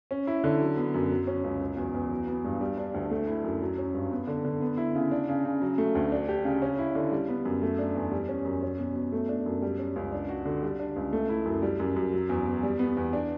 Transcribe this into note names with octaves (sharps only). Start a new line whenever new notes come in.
C#4
E4
D3
F#3
B3
F#2
F#3
C#4
C#2
F#3
E2
E2
F#3
B3
G2
G3
D4
D2
A3
E4
F#2
F#3
C#4
G2
B3
D3
D3
B3
E4
C#3
D4
C#3
C#3
F#3
A3
D2
D4
G4
C#3
C#4
E4
D3
G3
B3
F#2
A3
D4
E2
G3
C#4
F#2
C#4
B2
B2
A3
D4
F#2
G3
C#4
C#2
D4
F#4
D3
G3
D4
C#2
A3
E4
F#2
G3
F#2
F#2
F#3
E2
E2
G3
B3
E2
D4